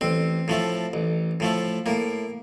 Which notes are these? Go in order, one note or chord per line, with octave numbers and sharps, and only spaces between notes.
A1 C4
A2 F3 A3
A1
A2 F3 A3
A2 A#3